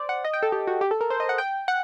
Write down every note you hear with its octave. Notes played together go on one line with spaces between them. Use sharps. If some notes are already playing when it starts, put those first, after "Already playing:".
Already playing: C5 D5
F#5
D#5
G5
A4
G4
F#4
G4
A4
A#4
C5
D#5
F#5
G5
F#5